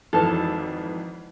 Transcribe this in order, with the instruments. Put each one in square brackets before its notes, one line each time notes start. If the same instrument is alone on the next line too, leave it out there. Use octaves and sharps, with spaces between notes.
[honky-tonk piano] G#1 F2 E3 [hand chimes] D#4 B4 [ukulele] A4